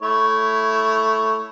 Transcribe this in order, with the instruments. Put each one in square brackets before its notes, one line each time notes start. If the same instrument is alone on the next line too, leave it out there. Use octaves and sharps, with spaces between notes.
[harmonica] A3 E4 C#5